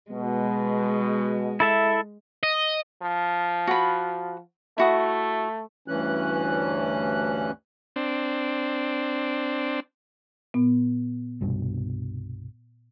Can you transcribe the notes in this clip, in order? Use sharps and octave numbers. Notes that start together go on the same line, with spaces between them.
B2 G#3
E4 A4 E5
D#5
F3
F#4 B5
A3 E4 F#4 D#6
D2 G2 E3 C#4 F#6
C4 D4
A#2 B3
C2 G2 B2